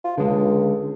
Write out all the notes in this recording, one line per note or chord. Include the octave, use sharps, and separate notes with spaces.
F4
C#2 D3 G#3